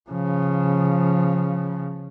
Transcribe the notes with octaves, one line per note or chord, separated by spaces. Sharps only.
C#3 F3